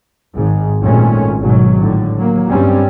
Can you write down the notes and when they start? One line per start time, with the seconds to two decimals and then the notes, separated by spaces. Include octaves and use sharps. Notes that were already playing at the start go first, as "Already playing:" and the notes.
0.35 G#1 G#2
0.82 G#1 F2 A#2 G#3 A3 C#4
1.40 G#1 G#2 B2 F#3
1.79 A2 D3
2.17 F#3 A#3
2.49 G2 G3 C4 C#4